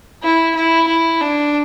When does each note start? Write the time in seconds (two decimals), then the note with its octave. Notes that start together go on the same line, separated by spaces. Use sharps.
0.23 E4
0.55 E4
0.88 E4
1.21 D4